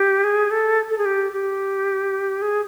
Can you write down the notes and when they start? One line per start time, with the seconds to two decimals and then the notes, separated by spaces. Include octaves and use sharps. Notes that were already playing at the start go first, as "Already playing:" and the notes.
Already playing: G4
0.24 G#4
0.51 A4
0.90 A4
0.98 G#4
1.05 G4
1.32 G4
2.42 G#4